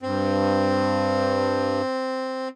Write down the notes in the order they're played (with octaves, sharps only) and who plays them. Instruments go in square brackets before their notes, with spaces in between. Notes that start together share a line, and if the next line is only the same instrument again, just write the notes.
[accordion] G2 [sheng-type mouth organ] C4